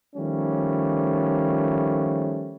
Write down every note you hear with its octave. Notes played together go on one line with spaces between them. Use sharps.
D#3 F3 G3 A3 C#4